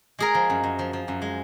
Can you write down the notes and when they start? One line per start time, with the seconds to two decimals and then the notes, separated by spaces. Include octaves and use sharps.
0.19 G#3 G#4 A#4
0.35 F3
0.50 F#2
0.64 F#2
0.79 F3
0.93 F3
1.08 F#2
1.22 G#3